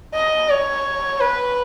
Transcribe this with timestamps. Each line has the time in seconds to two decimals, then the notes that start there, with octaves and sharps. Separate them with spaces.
0.14 D#5
0.49 C#5
1.21 B4